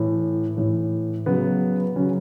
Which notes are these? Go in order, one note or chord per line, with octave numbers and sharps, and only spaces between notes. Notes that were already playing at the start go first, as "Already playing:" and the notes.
Already playing: A2 E3
A2 E3
C#3 F#3 B3
C#3 F#3 C#4